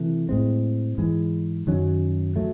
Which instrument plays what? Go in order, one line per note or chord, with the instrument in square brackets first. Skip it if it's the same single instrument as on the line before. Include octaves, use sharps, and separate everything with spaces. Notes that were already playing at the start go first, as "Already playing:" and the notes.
Already playing: [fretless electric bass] C3 E3 A3
A2 G#3 C4
G#2 E3 G#3
F#2 D#3 F#3 C#4
F#3 A3